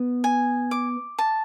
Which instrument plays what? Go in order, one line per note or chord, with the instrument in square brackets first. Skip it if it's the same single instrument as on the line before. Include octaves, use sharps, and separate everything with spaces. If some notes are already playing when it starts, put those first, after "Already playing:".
Already playing: [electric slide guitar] B3
[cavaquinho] G#5
D6
A5